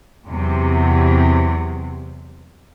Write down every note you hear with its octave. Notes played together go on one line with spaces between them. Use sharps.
E2 C3 F#3